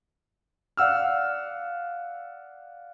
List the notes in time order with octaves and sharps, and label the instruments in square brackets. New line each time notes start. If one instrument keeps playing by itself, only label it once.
[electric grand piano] D5 F5 F#5 E6 F6